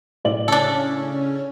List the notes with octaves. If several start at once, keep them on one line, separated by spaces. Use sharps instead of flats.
A2 D5 F#7
C#3 C#4 D4 A4